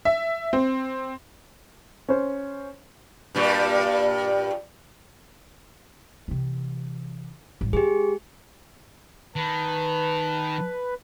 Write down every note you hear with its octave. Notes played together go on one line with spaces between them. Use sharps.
E5
C4
C#4 C5
G2 A#2 G3
C3 E3
A1 G3
G#3 G4 G#4
D#3 B4 A5